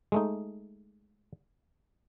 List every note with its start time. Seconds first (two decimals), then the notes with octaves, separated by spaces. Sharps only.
0.12 G#3 A3 D#4